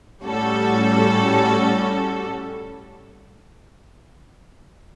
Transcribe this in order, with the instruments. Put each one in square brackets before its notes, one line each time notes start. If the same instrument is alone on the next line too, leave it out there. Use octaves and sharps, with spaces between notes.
[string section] A2 G3 C#4 F#4 A4